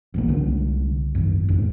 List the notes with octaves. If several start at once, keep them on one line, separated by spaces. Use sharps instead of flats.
E1 A#1 A#3
C2 D3
G#1 F#2
D1 F2 A2